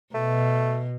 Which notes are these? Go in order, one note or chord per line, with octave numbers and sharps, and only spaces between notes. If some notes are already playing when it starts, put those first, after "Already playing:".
B2 A3